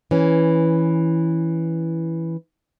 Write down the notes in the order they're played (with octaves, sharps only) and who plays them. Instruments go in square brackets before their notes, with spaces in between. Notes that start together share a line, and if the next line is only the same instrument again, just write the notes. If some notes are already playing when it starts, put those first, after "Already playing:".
[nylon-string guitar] E3 C#4